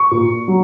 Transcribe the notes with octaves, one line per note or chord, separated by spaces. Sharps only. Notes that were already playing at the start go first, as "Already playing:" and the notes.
Already playing: C#6
A#2
F#3